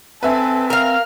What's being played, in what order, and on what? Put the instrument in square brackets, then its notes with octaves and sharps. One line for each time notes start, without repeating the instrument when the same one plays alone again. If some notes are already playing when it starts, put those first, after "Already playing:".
[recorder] C4 [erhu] A4 [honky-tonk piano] B4 E5 G#5
[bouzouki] A#4 F5 [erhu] F6